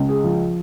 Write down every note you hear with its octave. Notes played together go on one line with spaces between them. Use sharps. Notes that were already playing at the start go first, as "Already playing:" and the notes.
Already playing: C#2
G#4
F3